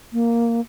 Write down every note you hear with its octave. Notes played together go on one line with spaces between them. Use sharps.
A#3